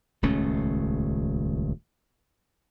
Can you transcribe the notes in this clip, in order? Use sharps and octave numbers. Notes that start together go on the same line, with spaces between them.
D#1 C#2 A3 C#4